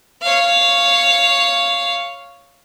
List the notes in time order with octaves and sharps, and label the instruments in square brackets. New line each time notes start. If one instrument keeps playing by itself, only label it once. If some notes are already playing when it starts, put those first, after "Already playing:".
[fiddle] C#5 F5